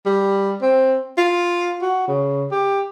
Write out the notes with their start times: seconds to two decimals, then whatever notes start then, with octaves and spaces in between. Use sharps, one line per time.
0.06 G3
0.62 C4
1.18 F4
1.81 F#4
2.08 C#3
2.51 G4